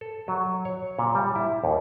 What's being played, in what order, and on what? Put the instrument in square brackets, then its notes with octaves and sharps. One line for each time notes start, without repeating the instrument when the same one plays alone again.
[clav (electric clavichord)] A4
F#3
C#5
A#2
G3
E4
D#2